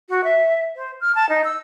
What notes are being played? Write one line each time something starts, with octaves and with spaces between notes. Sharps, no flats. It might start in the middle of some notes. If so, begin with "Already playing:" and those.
F#4
E5
C5
F6
A5
D#4
E6